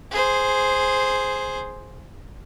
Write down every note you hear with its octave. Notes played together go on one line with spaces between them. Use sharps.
G#4 C5